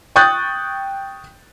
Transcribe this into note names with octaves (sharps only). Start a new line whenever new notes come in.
G5 C#6 D#6 F#6 G6 A6